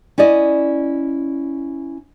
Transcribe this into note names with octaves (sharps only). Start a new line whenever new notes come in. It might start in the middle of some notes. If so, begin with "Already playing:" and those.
C#4 E4 D5 D#5